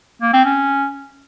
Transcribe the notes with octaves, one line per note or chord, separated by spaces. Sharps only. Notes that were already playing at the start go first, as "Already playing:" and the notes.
A#3
C4
C#4